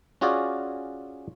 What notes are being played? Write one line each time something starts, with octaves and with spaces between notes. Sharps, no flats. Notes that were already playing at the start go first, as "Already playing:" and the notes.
C#4 F4 F#4 G#4 D5